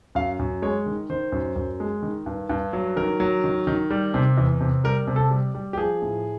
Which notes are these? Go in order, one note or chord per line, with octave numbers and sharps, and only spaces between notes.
F#2 F5
F#2
G#3 C#5
D#3
D#3 C5
F#2
F#2
G#3
D#3
G2
G2
F#3
D#3 A#4
F#3
D#3
D#3
G3
C3
E2
C3
G3 A#4
C3
A4
G3
G3
G4
F3 G#4
A2